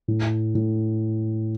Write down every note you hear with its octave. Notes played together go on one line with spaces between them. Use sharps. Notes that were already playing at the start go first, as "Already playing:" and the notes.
A2
A2